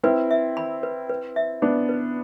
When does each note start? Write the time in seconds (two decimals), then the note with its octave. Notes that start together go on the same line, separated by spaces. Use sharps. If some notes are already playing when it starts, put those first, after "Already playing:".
0.03 C4 E4 B4
0.31 E5
0.57 B5
0.83 B4
1.09 B4
1.36 E5
1.62 B3 D4 B5
1.89 B4